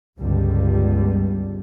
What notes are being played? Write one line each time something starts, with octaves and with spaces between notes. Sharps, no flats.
G1 C#2 G2 D3 G3